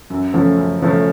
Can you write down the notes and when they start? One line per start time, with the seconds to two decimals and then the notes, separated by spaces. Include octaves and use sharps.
0.10 F#2
0.34 C#3 F3 A3 C#4
0.57 F#2
0.82 C#3 F3 A3 C#4